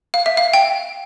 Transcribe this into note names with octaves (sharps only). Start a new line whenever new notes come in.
F5
E5
F5
G5